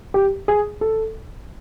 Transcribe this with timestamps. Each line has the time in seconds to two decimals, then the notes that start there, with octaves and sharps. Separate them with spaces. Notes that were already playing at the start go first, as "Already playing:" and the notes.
0.14 G4
0.48 G#4
0.81 A4